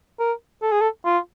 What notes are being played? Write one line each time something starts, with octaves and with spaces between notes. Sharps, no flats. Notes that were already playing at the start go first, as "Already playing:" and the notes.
A#4
A4
G#4
A4
F4